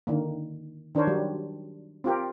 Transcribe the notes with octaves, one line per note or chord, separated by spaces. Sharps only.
D3 D#3 A#3
D#3 D4 A#4 C5 C#5
F#3 G3
C4 F4 G4 A#4